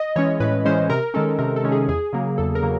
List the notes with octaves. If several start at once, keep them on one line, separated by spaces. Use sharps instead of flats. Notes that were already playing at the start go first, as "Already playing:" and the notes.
Already playing: D#5
E3 G#3 C#4 C#5
A2 B4
E3 G#3 C#4 C5
C3 A#4
D#3 G#3 C#4 A4
C3 A#4
A4
D#3 G#3 C#4
G#4
E2 G#4
C#3 F#3 A#3
E2 A4
A#4
C#3 F#3 A#3